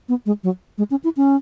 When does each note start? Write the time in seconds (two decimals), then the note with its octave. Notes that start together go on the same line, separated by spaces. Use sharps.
0.09 B3
0.26 G#3
0.44 F#3
0.78 G#3
0.91 C#4
1.04 E4
1.17 C#4